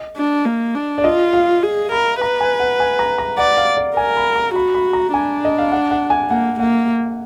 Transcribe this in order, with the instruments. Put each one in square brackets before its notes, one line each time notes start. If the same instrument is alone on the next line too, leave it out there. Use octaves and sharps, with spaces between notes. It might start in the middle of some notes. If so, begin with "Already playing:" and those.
Already playing: [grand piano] D#5
[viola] D4
A#3
D4
[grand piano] D5
[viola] F4 [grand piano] D#5
[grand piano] F5
[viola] G#4
[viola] A#4 [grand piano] B5
[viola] B4 [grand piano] A#5
[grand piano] G#5
F#5
G#5
A#5
A#5
[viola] D5 [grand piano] F#5
[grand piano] F5
D5
[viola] A#4 [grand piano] G#5
[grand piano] B5
A#5
[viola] F#4 [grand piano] B5
[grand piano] B5
A#5
[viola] D4 [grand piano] G#5
[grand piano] D#5
F5
F#5
F#5
G#5
[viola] A#3 [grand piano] F#5
[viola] A#3 [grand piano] F#5